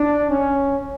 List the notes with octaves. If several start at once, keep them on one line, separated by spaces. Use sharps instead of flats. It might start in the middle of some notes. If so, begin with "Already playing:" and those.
Already playing: D4
C#4